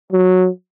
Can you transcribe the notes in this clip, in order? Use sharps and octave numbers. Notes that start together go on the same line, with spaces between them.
F#3